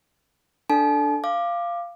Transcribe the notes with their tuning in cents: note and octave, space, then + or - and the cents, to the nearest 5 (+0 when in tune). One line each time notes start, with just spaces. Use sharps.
D4 +0 A4 +0 A5 -40
F5 -10 D6 +15